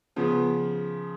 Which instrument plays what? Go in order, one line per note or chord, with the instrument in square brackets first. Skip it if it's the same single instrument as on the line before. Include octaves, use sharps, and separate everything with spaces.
[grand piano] C#3 F3 [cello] B3